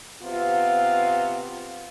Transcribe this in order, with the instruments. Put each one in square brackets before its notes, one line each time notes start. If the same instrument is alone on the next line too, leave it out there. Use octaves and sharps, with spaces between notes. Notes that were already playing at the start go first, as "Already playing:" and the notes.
[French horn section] C3 B3 F4